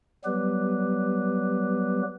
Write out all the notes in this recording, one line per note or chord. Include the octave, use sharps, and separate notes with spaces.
F#3 G3 B3 G4 B4